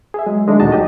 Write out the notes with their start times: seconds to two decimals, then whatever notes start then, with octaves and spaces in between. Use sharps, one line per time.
0.14 G#4 E5
0.27 F#3 G#3
0.47 D#3 G#3 A3 D4
0.60 D2 A#2 D#4 F#4 D#5 A5
0.72 F#3 G4 D#5